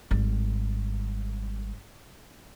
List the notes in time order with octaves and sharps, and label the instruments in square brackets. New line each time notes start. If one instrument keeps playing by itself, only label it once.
[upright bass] G#1 G3